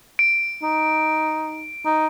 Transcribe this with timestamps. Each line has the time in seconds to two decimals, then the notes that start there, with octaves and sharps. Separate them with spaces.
0.19 D7
0.63 D#4
1.85 D#4